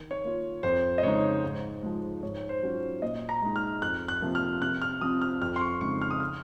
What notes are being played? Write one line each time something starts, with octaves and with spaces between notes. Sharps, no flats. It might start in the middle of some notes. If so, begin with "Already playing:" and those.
Already playing: D#3
C#5
A#3 F4
F2 C5
D#5
C#3 G#3 D#4 C#5
G#2
F3 G#3
G#2 C#5
C5
F#3 C#4 F4
A#2 D#5
A#5
G#3 D#4
F6
F2 F#6
F#6
C3 F3 A#3
F6
C3 F#6
F6
F3 C4 D#6
F6
F2 F6
C6
C#6
C#3 G#3 C4 D#4 C#6
F6
D#6
F6